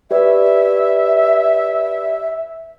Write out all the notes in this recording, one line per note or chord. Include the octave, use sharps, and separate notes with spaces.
G4 B4 D5 E5